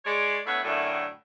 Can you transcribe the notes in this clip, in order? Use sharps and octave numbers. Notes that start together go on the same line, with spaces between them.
G#3 C#5 D5
A3 B3 D4 E4 C#5 F5
F#2 A2 D3